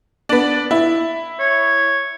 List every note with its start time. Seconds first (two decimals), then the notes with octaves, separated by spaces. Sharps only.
0.29 B3 D4
0.71 E4
1.40 C#5